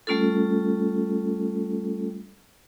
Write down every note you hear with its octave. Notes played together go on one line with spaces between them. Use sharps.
G3 A3 C#4 F4 A4